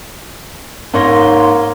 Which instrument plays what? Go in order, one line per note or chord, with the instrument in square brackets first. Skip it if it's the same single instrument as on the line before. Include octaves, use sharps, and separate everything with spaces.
[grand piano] G#2 C#5 A#6 [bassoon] A#3 [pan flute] C6